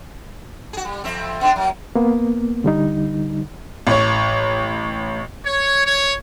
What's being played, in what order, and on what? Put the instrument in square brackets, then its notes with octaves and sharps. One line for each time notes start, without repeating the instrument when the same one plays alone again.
[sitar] F#4 G#4
G3
F2 C4 E5
B3 D4 G#4
F#3 A#3
[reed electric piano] A#3 B3
D3 G3 D#4
[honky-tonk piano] A1 C#5
[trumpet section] C#5
C#5